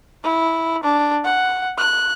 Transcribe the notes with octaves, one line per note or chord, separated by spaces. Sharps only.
E4
D4
F#5
F#6